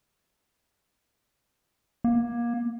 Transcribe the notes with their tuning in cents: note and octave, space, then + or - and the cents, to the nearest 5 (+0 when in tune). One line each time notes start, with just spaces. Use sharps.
A#3 +25